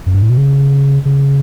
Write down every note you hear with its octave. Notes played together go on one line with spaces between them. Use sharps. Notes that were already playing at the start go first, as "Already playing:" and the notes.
F#2
G2
A2
B2
C#3
C#3